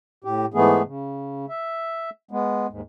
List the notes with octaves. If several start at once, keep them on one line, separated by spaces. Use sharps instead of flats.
A2 G4
G#2 E3 A3 B3 G#4
C#3
E5
G#3 B3
D#2 G#2